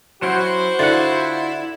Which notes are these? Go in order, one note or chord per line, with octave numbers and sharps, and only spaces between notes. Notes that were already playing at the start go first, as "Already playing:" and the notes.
F#3 C#4 E4 F#4 C5
D3 E4 F4 F#5